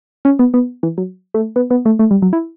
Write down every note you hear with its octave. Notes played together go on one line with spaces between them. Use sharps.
C#4
B3
B3
E3
F#3
A3
B3
B3
A3
A3
G3
F#3
E4